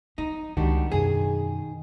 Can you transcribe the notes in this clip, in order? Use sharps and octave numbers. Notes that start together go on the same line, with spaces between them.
F3 D#4
C#2 D#3 F3 G3 D4 F#4
F#2 B2 G#4